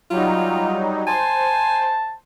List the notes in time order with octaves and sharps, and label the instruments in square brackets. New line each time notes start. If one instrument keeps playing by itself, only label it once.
[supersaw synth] F#3 G3 D#4 [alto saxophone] F4
[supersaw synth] C5 [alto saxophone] G#5 [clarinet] A5